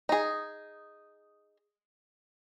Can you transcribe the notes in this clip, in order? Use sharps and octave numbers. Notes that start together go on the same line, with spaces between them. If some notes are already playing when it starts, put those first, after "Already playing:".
D#4 G#4